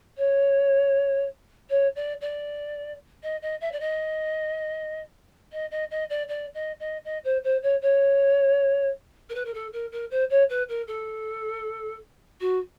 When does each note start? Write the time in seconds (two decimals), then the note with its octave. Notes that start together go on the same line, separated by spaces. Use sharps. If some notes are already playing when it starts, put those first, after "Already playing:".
0.18 C#5
1.70 C#5
1.96 D5
2.21 D5
3.23 D#5
3.42 D#5
3.61 E5
3.72 D5
3.80 D#5
5.52 D#5
5.71 D#5
5.91 D#5
6.10 D5
6.29 D5
6.55 D#5
6.80 D#5
7.05 D#5
7.24 C5
7.44 C5
7.63 C#5
7.82 C#5
9.30 A#4
9.35 B4
9.45 A#4
9.54 A4
9.73 A#4
9.92 A#4
10.11 C5
10.30 C#5
10.50 B4
10.69 A#4
10.88 A4
12.41 F#4